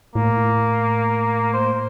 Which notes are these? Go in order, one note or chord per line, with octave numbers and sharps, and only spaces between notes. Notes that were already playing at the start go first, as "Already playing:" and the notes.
A2 A#3
C5